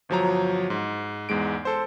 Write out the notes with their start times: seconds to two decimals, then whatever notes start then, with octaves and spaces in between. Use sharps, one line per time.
0.09 G1 F3 F#3 A#5
0.70 G#2
1.29 E2 G#2 G#3 D7
1.65 A4 C5